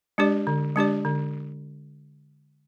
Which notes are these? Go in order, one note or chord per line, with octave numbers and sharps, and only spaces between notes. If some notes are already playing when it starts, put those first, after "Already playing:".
G#3 D4 G4 D5
D3
G#3 D4 G4 D5
D3